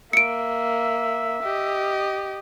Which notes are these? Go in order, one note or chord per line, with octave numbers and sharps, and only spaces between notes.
A#3 E5 C#7 D7
G4 D#5